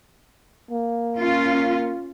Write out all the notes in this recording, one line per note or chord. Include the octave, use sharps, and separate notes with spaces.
A#3
C#4 F4